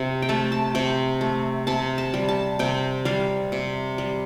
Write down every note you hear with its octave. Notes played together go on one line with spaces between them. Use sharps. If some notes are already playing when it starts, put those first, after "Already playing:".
Already playing: C3
G5
A3 A5
A5
C3 G5
A3
C3 A5
A5
G3
A5
C3 G5
G3 F5
C3
G3